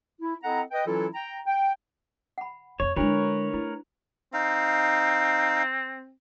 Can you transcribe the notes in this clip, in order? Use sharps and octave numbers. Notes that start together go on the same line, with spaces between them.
E4
C4 E4 A4 D#5 F#5 A#5
B4 D#5 G5
E3 F#3 C#4 E4 F4 A4
G5 A#5
G5
F#5 B5
F2 C4 C#5
D3 G#3 D4 E4 F#4 A#4 B4 C#5
A3 E4
C4 D#4 F5